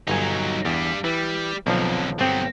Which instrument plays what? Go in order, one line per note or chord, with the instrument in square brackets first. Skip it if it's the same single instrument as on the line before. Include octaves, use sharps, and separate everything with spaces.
[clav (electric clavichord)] G1 G#5 [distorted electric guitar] F#3 D#4
[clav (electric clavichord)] E2 [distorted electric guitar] G2 G3
[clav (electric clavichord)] E3 [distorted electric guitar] G3
[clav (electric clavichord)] B1 F3 [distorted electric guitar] F2 D3
[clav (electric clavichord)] G1 C4 G5 [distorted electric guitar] F#3 B3